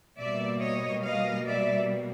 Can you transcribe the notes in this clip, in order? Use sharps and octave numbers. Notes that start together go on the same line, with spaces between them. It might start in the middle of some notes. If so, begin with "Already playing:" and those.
B2 G3 A#3 D5 E5
C#5 D#5
D#5 F5
D5 E5